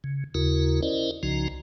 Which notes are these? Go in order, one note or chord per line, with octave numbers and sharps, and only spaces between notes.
C#3
D#2 C#3 E4 F#4 A#4
C#4 E4 A#4 C5 D5 D#5
C2 C#3 F3 D#4 F#4 A#5